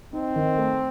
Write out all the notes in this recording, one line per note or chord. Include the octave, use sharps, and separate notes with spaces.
C4 D#4
D#3
A3